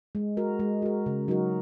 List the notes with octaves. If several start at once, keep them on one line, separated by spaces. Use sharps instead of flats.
G#3
F#4 A#4
G#3
F#4 A#4
C#3
F#3 D#4 F#4 A#4